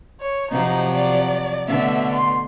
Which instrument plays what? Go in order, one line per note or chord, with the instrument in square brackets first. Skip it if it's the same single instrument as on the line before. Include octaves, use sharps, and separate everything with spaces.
[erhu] C#5
[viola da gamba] C3 F3 F#3 [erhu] D#4
[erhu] D5
[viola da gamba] B2 D3 A3 [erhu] E5
[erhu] C6